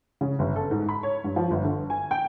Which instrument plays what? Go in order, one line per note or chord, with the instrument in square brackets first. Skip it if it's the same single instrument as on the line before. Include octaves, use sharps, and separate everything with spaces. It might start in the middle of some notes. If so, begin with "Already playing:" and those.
[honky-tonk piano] C#3
G1
A4
G#2
B5
C#5
G2
F3
G1
D3
G#5
G5